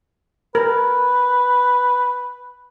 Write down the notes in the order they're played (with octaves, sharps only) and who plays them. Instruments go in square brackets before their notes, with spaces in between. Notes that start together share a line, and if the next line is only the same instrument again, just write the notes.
[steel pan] A#4 [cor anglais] B4